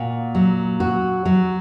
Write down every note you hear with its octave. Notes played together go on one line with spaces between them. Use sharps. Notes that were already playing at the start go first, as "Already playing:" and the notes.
Already playing: A#2 F#4
F#3
F#4
F#3